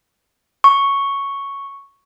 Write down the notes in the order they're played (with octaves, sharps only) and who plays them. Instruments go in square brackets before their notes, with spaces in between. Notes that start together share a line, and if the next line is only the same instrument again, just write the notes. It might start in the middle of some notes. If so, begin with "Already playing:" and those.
[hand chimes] C#6